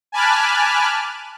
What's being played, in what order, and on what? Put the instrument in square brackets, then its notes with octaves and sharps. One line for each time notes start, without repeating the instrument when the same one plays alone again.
[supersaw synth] G#5 A5 B5 D6 F6 F#6